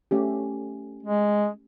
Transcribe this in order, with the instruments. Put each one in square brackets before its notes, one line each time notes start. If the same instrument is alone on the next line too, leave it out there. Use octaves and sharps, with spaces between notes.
[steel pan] A3 C#4 G4
[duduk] G#3